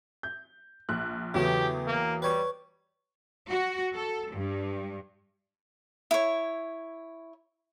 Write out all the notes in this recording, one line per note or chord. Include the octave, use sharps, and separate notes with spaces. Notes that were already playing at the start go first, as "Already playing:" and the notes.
G6
A#1 F#6
E2 C#3 F#3 A3 B3 G4 G5
A#3
G3 B4 C#5
F#4
A4
G2
E4 C#5